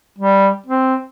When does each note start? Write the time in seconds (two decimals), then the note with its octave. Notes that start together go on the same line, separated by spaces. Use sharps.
0.18 G3
0.66 C4